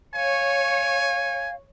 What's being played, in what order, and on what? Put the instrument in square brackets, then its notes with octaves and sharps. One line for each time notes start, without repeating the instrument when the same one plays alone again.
[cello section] C#5 [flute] F5 [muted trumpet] G#5